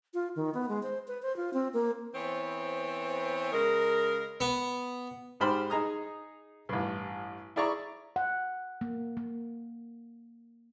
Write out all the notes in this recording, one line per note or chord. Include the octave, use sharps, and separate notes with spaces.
F4
D#3
B3
G#3
C5
B4
C5
F4
C4
A#3
E3 B3 C4 C5 C#5
C#3 G#3 A#4
B3
G#2 G4 C5 B5 F6
D#4 G#4 A#5 D#6
A1 G2
E4 G#4 D5 A#5 C#6
F#5
A#3
A#3